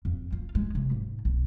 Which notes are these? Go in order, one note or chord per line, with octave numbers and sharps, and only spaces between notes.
F2
F4
G#3
C3
G#2
B1